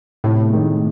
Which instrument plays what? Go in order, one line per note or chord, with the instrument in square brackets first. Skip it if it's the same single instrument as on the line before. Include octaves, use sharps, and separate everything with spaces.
[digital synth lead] A2 [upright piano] C3
[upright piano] D#3 G#3